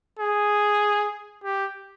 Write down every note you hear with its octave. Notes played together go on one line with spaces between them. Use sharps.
G#4
G4